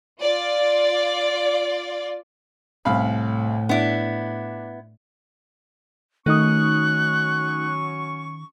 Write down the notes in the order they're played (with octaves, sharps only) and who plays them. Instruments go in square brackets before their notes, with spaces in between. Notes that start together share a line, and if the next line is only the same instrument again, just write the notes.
[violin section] F4 D5
[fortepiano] C2 F5 B5 [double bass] A2
[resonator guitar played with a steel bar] B3 E4 [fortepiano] D4
[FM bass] D#3 [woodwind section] F#3 C#4 C#6 [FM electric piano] A3 D#4 D#6 [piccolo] F#6